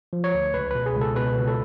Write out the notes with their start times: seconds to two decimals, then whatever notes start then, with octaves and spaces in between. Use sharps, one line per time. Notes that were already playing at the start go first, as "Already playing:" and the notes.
0.13 F3
0.24 C#5
0.34 D2
0.54 C#2 B4
0.71 B2 B4
0.86 G#4
0.96 C#2
1.01 A4
1.16 B2 B4
1.37 C#2
1.47 A4